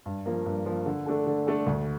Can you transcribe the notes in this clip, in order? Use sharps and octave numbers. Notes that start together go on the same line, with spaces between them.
G2
F3 A#3
G2
F3 A#3
D3
A3 D4 A4
D3
A3 D4 A4
D2